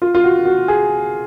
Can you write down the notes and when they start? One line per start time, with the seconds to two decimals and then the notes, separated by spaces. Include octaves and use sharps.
0.02 F4
0.15 F4
0.24 F#4
0.45 F#4
0.68 G#4